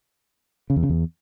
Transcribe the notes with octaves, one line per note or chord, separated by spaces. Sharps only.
C#3
E2
C#3
E2